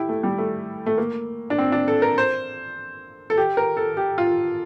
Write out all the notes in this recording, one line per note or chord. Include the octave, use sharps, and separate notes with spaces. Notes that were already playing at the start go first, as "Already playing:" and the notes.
Already playing: E4 G4
A3
G3
A3
A3
A#3
D4
C4
D4
A4
A#4
C5
A4
G4
A#4
A4
G4
F4